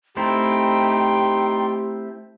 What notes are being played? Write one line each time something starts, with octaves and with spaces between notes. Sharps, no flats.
A3 C4 D#4 E4 G4 G5 C6